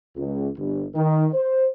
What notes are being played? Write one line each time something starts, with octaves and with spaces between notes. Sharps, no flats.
C#2
G1
D#3
C5